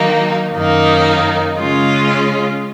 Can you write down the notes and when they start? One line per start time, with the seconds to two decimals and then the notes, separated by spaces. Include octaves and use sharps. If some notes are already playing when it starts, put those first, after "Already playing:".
Already playing: D#3 F#3 A#3 D#4
0.55 F#2 D#3 A#3 D#4
1.59 C#3 G#3 C#4 F4